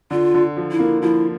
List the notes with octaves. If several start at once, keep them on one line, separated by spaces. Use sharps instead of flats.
D3 F4
D3
F3
E4
A#3
F3 E4